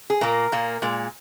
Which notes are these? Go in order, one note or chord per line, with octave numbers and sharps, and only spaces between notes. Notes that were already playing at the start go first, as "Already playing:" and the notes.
G#4
A#2 A#3 A#4
A#2 A#3
A#2 G#3